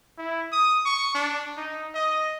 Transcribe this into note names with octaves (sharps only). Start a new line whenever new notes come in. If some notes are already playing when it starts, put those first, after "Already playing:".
E4
D#6
C#6
D4
D#4
D#5